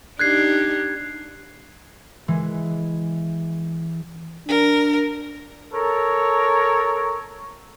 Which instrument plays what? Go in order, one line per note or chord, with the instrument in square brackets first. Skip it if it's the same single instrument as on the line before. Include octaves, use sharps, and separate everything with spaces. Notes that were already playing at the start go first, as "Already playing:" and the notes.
[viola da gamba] D4 D#4 G4 [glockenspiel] F#6 G#6 C7
[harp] E3 G#3
[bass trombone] D4 [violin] A#4
[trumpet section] A4 A#4 C#5